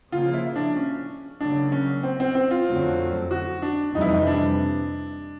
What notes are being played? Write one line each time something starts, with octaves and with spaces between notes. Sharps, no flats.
C#3 F3 A#3 F4
E4
D4
C#4
C#3 F#3 A#3 D4
C#4
C4
C4
C4
F4
F2 D3 F#3 A3 C4
F#4
D4
F2 C3 E3 G3 D#4
E4
D#4
D4